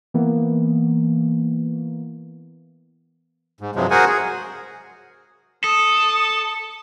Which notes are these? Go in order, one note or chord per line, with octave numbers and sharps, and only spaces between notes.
E3 A#3 B3
G#2
G2 C3 F3 F#3 G#3
F#4 G#4 A#4 C5 F#5 G#5
G#4
A4 D#6